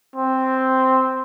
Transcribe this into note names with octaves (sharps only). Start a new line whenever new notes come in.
C4